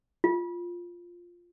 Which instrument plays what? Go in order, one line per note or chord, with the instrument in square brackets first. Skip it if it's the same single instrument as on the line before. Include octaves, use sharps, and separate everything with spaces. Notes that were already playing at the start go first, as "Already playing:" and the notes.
[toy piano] F4